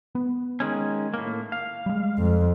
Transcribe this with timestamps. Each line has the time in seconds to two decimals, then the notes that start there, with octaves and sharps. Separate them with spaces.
0.15 B3
0.60 D#3 G#3 C#4
1.14 A2 A#3
1.52 F5
1.86 G3 G#3
2.18 F2